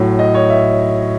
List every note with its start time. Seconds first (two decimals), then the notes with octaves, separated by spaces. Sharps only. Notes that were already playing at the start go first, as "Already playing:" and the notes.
Already playing: A2 F#3
0.19 D#5
0.34 C#5
0.50 E5